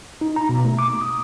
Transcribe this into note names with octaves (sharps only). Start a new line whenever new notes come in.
D#4
A#5
B2
A3
D6
D#6